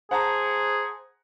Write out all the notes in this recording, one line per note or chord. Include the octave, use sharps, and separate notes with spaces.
G#4 C5 F#5 A5 A#5